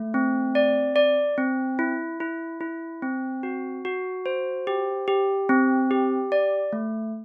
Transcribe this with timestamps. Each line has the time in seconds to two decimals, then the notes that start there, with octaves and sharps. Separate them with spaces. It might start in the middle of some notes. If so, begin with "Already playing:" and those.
Already playing: A3
0.14 C4
0.55 D5
0.96 D5
1.38 C4
1.79 E4
2.20 E4
2.61 E4
3.02 C4
3.43 F#4
3.85 F#4
4.26 C5
4.67 G4
5.08 G4
5.49 C4
5.91 G4
6.32 D5
6.73 A3